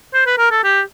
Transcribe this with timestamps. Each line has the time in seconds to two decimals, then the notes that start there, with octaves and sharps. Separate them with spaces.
0.14 C5
0.26 B4
0.38 A#4
0.51 A4
0.64 G4